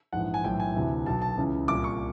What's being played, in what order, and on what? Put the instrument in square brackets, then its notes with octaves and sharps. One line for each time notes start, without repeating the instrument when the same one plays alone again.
[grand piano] A#1 G#2 E3 F#5
G#5
B1 A2 E3 G5
G#5
D2 C3 E3
B1 B2 A5
A5
C#2 C#3 E3
C2 A#2 D6
C#6